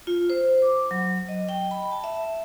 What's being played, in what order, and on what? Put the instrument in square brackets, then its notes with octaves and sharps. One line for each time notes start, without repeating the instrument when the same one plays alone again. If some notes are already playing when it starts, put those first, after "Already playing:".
[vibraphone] F4
C5
D6
F#3
D#5
G5
B5
A5
E5